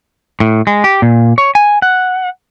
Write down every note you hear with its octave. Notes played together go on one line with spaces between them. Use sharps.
A2
G#3
G4
A#2
C#5
G#5
F#5